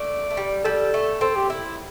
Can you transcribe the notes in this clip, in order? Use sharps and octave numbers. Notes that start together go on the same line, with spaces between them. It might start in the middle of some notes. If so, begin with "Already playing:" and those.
Already playing: A3 D5
A3
G3
G3 A4
A3
C4 A4
G4
E4